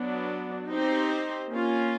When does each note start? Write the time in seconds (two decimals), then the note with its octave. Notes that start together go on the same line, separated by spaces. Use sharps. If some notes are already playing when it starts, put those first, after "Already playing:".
Already playing: F#3 B3 D4
0.69 C4 D#4 G4 C5
1.50 A#3 C#4 F4